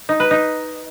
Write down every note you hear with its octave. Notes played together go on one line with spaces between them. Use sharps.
D#4
B4
D#4